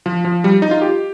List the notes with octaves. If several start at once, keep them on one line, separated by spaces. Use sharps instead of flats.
F3
F3
G3
D#4
F4
G4